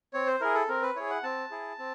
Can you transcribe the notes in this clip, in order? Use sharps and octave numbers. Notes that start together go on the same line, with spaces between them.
C4 C#5
C5
E4 G#4 A#4
A4
C4 A#4
B4
E4 G#4 C#5
F#5
C4 A5
E4 G#4
C4